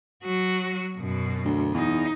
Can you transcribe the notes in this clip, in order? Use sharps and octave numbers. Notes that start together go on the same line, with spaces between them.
F#3 F#4
F#2 B2
D2
E2 D#4